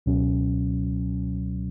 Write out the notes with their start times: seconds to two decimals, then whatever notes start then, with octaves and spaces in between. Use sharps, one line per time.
0.06 C#2 B2 F#3 C#4